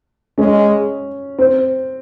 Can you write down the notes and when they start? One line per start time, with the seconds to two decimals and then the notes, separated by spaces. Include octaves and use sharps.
0.38 G#3 C#4
1.39 C4